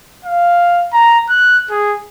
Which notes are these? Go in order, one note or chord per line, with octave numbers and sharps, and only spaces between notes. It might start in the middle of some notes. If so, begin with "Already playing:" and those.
F5
A#5
F#6
G#4